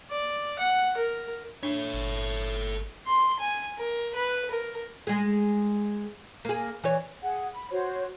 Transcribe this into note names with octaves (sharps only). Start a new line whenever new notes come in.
D5
F#5
A#4
D4 A4 C#5
G1
C6
G#5
A#4
B4
A#4
G#3 G#4
A#3 G#4
E3 C#5
G#4 F#5
B5
F#4 C5 C#5